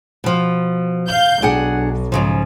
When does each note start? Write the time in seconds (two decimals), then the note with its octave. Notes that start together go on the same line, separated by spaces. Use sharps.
0.24 B2 F3
1.08 F5 G6
1.42 B1 D4 G#4 F#5
2.12 G#2 C#3 F3